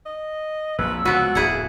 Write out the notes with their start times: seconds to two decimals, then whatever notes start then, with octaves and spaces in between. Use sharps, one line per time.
0.06 D#5
0.79 A#1 F2 B4 E6
1.05 C#2 C3 F3 B3 F#4 B4
1.35 D1 F2 E4 G#4 F#5